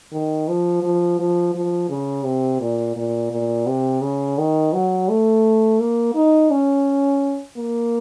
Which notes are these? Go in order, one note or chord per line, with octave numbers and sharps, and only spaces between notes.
D#3
F3
F3
F3
F3
C#3
C3
A#2
A#2
A#2
C3
C#3
D#3
F#3
A3
A#3
D#4
C#4
A#3